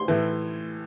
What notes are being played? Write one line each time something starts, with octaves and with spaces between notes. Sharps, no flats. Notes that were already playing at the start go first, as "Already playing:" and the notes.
Already playing: C6
A2 E3